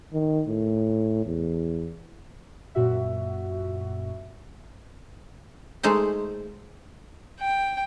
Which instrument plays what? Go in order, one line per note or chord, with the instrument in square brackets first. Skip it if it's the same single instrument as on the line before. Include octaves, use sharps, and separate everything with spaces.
[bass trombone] D#3
A2
E2
[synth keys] F#2 A#2 F#4 E5
[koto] G#3 A3 D#4 C5
[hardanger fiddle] G5